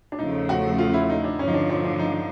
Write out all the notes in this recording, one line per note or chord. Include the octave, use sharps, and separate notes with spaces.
D4
E2 C#3 F3 A3 D#4
F#4
F4
E4
D#4
D4
G2 D3 F3 C#4
D#4
D4
D4
D4
D#4